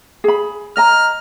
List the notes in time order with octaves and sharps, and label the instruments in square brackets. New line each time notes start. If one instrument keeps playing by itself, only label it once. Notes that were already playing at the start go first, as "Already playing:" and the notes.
[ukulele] G#4 B5
[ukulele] D#5 A#5 [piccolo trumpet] F6